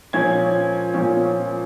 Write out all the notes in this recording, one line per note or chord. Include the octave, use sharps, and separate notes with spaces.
A#2 F3 C#4 G#6
A#2 F3 C#4